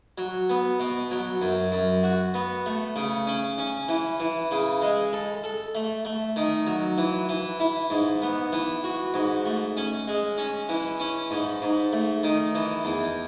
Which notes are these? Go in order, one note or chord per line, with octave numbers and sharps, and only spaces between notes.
F#3
B3
B2
F#3
F#2
F#2
F#4
B3
A3
C#3
C#4
C#4
E3
E3
C#3
G#3
A4
A4
A3
A3
D#3
F#3
E3
E3
E4
G#2
B3
E3
F#4
G#2
A3
C#4
G#3
C#4
E3
C#4
G#2
G#2
A3
D#3
E3
E2